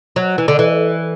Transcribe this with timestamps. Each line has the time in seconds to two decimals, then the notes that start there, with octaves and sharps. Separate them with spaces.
0.16 F#3
0.38 E3
0.48 D3
0.59 E3